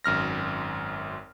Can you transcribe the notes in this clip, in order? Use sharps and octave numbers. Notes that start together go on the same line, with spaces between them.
G#1 F#2 F6 A#6